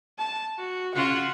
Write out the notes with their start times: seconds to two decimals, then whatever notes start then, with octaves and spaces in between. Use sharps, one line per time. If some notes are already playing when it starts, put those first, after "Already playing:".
0.18 A5
0.59 F#4
0.94 C#3 F4 F#4 F#5